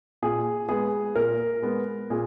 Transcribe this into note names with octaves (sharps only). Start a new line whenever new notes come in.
A#2 G#4
G#3 B3 G#4
A#2 A#4
G#3 B3
A#2 G#4